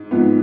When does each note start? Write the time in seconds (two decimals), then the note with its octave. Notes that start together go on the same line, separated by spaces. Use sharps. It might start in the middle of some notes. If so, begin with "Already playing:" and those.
Already playing: G#2
0.11 G#2 F3 B3